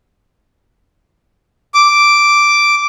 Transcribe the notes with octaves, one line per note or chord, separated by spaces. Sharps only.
D6